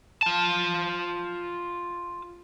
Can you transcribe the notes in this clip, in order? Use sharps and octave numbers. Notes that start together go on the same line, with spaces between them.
F4 A5